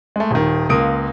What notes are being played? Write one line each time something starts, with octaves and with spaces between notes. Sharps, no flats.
G#3 A3
D#1 D#3
C#2 A#3 D#6 D7